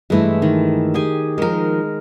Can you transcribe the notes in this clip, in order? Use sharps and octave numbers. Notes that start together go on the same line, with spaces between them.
G2 E3 G#3 A3 E4
D#3
G4 G#4 G#5
D#3 F3 G#3 A#4